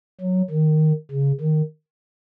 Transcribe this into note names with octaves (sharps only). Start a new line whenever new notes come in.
F#3
D#3
C#3
D#3